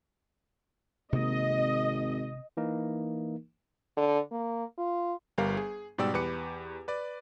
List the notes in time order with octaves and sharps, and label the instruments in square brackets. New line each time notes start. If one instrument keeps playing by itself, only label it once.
[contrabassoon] G#1 [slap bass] C3 A#3 [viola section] D#5
[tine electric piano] E3 A#3 D#4 A#4
[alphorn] D3
A#3
F4
[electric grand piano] G1 G3 A#4 F5
G#4
G#2 B2 G3 D5 G5 E6
E2 G4 B4 D6 C#7
B4 D5